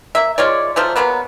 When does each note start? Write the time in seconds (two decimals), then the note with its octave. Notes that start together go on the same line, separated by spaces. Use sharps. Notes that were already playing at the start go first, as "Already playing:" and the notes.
0.15 A#3 E5
0.38 G#3 F4 C#5 D5
0.76 F3 F#3 A3
0.96 F#3 G#3 A#3 B3